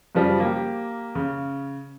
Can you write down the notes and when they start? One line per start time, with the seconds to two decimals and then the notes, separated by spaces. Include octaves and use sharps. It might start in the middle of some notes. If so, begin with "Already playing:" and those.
0.15 F#2 C#3 F3 G3
0.40 A#3 G4
1.15 C#3